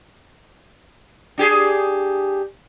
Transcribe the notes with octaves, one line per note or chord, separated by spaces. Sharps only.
D4 G4 G#4